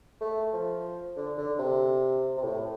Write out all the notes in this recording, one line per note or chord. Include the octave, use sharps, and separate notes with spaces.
A3
F3
D3
D3
C3
C3
A2